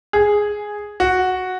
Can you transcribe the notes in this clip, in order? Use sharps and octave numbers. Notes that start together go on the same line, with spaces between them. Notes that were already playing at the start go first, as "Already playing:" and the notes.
G#4
F#4